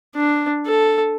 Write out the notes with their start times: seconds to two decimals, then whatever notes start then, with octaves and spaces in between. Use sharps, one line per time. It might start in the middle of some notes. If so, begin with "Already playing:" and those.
0.16 D4
0.66 A4